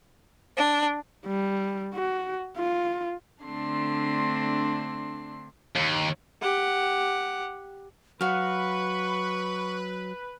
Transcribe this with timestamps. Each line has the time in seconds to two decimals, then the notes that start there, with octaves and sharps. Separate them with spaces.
0.56 D4
1.26 G3
1.94 F#4
2.57 F4
3.44 D3 A3 C4 D4 C6
5.76 D#2
6.42 G4 F#5
8.21 F#3 F#4 B4 F5 C#6